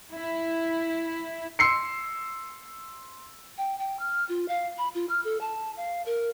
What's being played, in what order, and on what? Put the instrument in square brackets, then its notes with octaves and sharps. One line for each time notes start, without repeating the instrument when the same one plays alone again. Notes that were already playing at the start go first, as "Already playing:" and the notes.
[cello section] E4
[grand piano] C6 E6 C7 C#7
[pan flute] G5
G5
F6
F4
F5
B5
F4
F6
A4
A5
F5
A#4